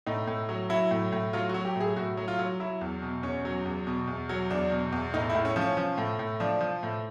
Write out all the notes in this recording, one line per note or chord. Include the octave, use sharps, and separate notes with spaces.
A2 D#4
A2
F#3
F#3 E4
A2
A2
F#3 F4
F#4
F#3
G4
A2 G#4
A2 F#4
F#3
F4
F#3
F#3 E4
E2
B2
E2 C#4
F#3
E2
B2
E2
F#3
E2 D4
B2
E2
A2 D#4
E4
A2
C#4
F3
C#4
F3
A2
A2
F3 D4
F3
A2